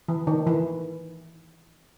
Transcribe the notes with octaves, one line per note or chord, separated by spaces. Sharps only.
E3
D#3
E3